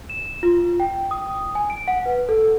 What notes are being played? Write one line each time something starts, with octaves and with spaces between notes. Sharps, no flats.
E7
F4
G5
D#6
G#5
D7
F#5
B4
A4